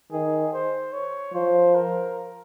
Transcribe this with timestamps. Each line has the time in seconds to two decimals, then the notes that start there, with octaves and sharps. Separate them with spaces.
0.12 D#3 G#4
0.53 C5
0.93 C#5
1.34 F3 C5
1.75 A#4